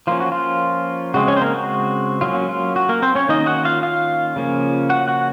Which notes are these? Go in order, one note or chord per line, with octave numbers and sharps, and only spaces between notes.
F3 A#3 C#4 F4
F#4
F4
C#3 G#3 C4 F#4
C#4 C#5
C5
A#3 A#4
F#4
F#3 A#3 C#4 F4
F4
F#4
A#3 A#4
C4 C5
C#4 C#5
D#3 A#3 C#4 D#4 D#5
F#4 F#5
F4 F5
F4 F5
C#3 F3 A#3 C#4
F#4 F#5
F#4 F#5